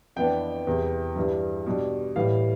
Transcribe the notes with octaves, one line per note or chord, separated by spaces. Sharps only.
F2 E3 B3 D4 G5
E2 C3 E3
G2 E3 G3 D4
B2 G3 D4
A2 E3 G3 F5